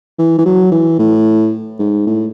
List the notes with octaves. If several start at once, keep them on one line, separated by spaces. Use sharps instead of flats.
E3
E3
F#3
E3
A2
G#2
A2